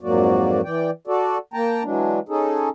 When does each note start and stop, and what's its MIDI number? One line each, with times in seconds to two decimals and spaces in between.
0.01 0.61 41
0.01 0.61 44
0.01 0.61 54
0.01 0.61 58
0.01 0.61 66
0.01 0.61 74
0.64 0.90 52
0.64 0.90 74
0.64 0.90 79
1.07 1.38 66
1.07 1.38 69
1.07 1.38 74
1.54 1.83 58
1.54 1.83 79
1.54 1.83 81
1.54 1.83 82
1.83 2.19 52
1.83 2.19 54
1.83 2.19 56
1.83 2.19 62
2.29 2.69 61
2.29 2.69 63
2.29 2.69 68
2.29 2.69 69